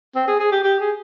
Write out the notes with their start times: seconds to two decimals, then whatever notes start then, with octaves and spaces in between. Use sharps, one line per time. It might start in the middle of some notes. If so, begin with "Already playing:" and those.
0.15 C4
0.27 G#4
0.39 G#4
0.51 G4
0.63 G4
0.79 G#4